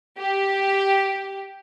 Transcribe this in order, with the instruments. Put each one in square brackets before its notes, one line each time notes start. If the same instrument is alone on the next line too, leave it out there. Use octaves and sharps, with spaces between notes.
[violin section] G4